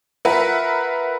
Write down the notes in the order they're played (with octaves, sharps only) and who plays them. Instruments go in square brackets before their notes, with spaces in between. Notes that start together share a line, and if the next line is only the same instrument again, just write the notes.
[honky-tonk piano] F4 A#4 B4 E5 F#5